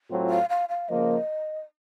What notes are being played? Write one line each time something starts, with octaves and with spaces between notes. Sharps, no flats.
A2 F#3 C4 F4
F5
F5
F5
C#3 F3 A#3 D#5